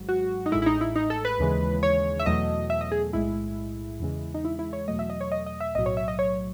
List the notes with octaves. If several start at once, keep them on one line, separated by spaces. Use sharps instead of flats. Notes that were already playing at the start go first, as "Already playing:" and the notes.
Already playing: G#1 G#2 F#3
F#4
D#4
A1 A2 G#3 E4
E4
D#4
E4
D#4
A4
B4
D#2 C#3 E3 G#3
C#5
E5
E2 B2 F#3 A3 D#5
E5
D#5
G#4
B1 A2 G#3 E4
E2 C#3 E3 G#3
D#4
E4
E4
C#5
E2 B2 F#3 A3 D#5
E5
D#5
C#5
D#5
D#5
E5
B1 A2 F#3 D#5
C#5
E5
D#5
C#5